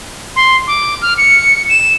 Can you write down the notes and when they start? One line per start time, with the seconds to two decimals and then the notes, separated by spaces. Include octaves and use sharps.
0.36 C6
0.67 D6
1.02 F6
1.18 C#7
1.69 E7